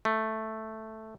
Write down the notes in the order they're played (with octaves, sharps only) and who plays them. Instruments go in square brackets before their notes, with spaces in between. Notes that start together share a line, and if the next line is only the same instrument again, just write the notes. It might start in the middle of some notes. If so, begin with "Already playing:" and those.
[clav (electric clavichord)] A3